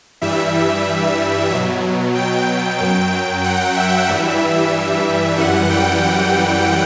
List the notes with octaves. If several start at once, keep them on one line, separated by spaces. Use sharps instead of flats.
G2 E3 G3 E5
B2 F#3
G5
F#2 F#3 G5
F#5
E5
G2 E3 G3
F#2 E3 G3 F#5
G5